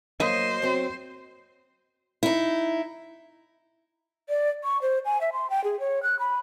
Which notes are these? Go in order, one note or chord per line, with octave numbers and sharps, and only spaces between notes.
F#3 A#3 C5 D#5
F#3 C4
D#4 E4
D5
C#6
C5
G#5
E5
C6
G5
G#4
C#5
F#6
B5